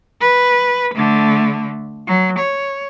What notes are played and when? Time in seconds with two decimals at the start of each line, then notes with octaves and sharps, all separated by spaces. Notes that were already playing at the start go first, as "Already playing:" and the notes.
0.20 B4
0.94 D3 A3
2.07 F#3
2.39 C#5